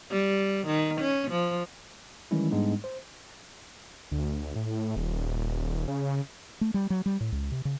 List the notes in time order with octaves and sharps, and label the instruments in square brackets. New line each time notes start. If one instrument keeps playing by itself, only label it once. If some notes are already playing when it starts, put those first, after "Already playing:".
[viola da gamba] G3
D#3
C#4
F3
[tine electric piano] D#3 E3 G3 G#3 C#4 E4
G#2 G3 G#3 B3 D4 D#4
C5
[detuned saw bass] D2
A2
D#1
C#3
[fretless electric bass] A3
G3
F#3
G3
A2
C#2
C3
C#3